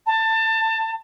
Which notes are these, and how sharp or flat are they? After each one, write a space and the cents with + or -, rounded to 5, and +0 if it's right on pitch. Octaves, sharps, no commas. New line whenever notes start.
A5 +20